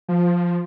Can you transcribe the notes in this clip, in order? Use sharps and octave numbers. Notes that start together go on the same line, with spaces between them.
F3